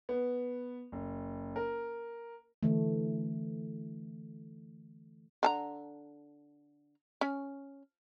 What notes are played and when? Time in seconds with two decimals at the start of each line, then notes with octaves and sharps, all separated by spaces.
0.09 B3
0.92 F#1
1.56 A#4
2.63 D3 E3 A3
5.43 D3 A5 A#5
7.21 C#4